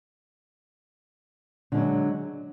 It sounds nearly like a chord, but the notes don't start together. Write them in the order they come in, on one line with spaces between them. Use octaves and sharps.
D3 G#3 F#3